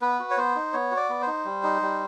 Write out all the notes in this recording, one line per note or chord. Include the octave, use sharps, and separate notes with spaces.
B3 B4
F#4
C#5
B3 C5
D#4
B3 C#5
F#4
D5
B3
C5
D#4
G3
D#4
G3